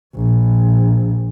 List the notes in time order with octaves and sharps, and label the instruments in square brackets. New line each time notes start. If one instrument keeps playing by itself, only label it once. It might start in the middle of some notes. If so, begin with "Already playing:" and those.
[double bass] A#1